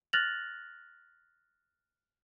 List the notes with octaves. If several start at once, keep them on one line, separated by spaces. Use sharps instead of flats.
F6 F#6 A6 A#6 F7 F#7